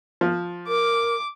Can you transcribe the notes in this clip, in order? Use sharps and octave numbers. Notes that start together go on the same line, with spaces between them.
F3
A#4 D6